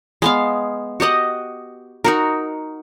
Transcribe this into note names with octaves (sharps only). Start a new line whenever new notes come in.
G#3 B3 F5
F#4 G4 D#5 F#5
D#4 F#4 A#4